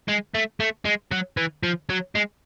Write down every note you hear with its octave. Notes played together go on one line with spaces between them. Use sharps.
G#3
A3
A3
G#3
F#3
E3
F3
F#3
G#3